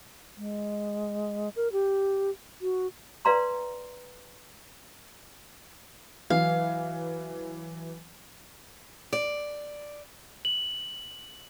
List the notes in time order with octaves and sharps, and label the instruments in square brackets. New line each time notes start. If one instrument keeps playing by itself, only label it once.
[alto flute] G#3
A#4
G4
F#4
[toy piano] B4 D5 F5 A#5 C6
[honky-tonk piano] E3 F#3 [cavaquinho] F5
[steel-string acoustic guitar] D5
[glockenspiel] F#7